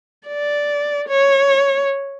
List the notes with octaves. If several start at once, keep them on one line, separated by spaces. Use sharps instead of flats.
D5
C#5